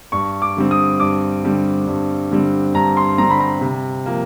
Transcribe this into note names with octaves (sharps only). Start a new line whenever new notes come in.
G2 C#6
D6
D3 G3 C4
D#6
G2 D6
D3 G3 C4
G2
D3 G3 C4
G2 A#5
C6
D3 G3 C4 A#5
B5
A#5
C3
F3 A#3